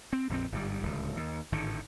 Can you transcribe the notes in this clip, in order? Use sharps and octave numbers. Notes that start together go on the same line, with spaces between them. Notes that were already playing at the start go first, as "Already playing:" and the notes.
C4
A#1 F2 G#3 C4
G1 G#2 G3
D1 C#2
D#2
G#1 A2 D3 D#3